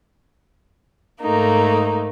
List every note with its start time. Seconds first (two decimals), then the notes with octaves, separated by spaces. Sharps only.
1.21 G#2 A3 A#3 D#4